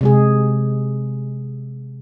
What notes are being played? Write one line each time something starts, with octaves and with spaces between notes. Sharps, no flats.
C3 G#3 G#4